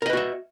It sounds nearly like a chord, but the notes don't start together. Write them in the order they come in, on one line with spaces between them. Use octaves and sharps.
A#4 D#5 B4 F#4 E5